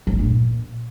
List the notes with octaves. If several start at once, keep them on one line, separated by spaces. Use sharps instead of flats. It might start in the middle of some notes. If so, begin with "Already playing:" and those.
F#3
E3
G2
A#2